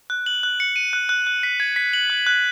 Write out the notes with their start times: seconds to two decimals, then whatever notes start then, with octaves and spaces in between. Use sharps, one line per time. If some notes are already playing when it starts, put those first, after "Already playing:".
0.10 F#6
0.26 F#7
0.43 F#6
0.60 C#7
0.76 D#7
0.93 F#6
1.09 F#6
1.27 F#6
1.43 B6
1.60 G#6
1.76 B6
1.93 F#7
2.10 F#6
2.26 F#6